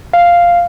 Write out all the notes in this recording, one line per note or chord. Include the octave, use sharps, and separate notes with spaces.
F5